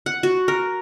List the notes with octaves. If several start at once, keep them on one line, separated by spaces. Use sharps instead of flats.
F#5
F#4
A#4